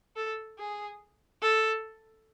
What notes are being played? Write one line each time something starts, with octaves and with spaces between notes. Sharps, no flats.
A4
G#4
A4